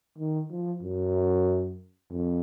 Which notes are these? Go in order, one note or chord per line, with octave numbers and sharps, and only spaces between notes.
D#3
F3
F#2
F2